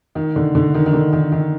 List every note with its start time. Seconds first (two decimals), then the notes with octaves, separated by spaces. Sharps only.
0.15 D#3
0.36 D3
0.55 D3
0.74 D#3
0.86 D#3
0.93 D3
1.13 D#3
1.32 D#3